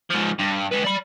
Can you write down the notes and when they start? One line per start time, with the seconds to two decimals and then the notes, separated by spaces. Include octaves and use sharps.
0.10 G#2 F3
0.39 G2
0.71 G#3 B4
0.84 D5 B5